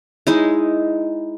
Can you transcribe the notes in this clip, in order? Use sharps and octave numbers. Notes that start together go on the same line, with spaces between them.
G#3 D#4 E4